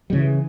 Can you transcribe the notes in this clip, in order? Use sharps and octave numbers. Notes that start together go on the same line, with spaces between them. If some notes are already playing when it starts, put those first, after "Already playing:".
C#3 E3 G3